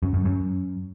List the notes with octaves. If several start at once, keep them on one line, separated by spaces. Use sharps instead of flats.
F#2
F#2
F#2